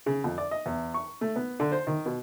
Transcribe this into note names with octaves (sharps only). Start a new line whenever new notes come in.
C#3
F2
D5
D#5
E2
C#6
A3
B3
D3
C5
D#3
B2